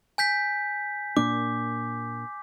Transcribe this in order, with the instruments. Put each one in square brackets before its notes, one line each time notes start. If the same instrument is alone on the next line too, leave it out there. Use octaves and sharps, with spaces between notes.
[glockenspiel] G#5 G6 B6
[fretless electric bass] A#2 A#3 D4 [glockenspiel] D6